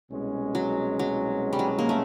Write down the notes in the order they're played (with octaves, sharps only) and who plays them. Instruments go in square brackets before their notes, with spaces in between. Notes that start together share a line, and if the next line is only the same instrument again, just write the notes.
[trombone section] C2 B2 G#3 C#4
[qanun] F#3
F#3
G3
F#3
A#3
A3